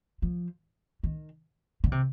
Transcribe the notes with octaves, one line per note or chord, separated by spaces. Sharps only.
F3
D#3
D3
C3